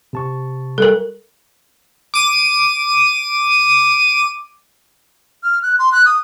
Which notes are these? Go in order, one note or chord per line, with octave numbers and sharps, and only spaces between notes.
C3 A5 C#6
G3 A4 A#4
D6 D#7
F6
F#6
C6
F#6
D#6